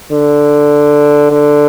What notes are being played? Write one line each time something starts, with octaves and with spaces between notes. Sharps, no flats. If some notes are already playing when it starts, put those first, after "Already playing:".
D3
D3